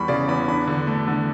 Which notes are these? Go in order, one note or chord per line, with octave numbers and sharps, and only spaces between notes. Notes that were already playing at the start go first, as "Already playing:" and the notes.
Already playing: E2 G3 B5 C#6
C#3 D5
E2 B5
D4 B5
D3
A3
D3